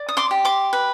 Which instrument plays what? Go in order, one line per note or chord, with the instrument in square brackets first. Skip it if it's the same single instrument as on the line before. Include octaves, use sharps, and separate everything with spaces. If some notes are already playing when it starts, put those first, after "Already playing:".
Already playing: [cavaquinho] D5
D#6
C6 D6
G4
C6 D6
B4